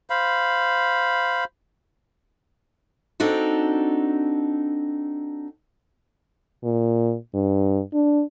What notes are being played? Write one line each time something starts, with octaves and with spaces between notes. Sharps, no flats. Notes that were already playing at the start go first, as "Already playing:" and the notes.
C5 F5 B5
C4 D4 D#4 F#4 A4
A#2
G2
D4